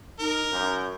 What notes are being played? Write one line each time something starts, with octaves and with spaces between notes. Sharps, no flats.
D#4 A#4
F#2 G6